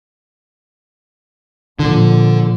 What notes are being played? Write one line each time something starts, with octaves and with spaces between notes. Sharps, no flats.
A#2 D3 F3